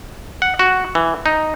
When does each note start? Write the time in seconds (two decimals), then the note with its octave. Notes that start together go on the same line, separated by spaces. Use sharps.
0.42 F#5
0.59 F#4
0.95 E3
1.26 D#4